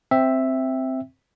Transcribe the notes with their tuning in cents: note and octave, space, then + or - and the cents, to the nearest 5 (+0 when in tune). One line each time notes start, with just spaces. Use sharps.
C4 +0 E5 +0 G5 +5